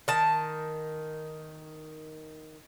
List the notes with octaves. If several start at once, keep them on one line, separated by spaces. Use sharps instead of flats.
D#3 A5